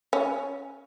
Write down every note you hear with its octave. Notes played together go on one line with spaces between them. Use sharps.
C#4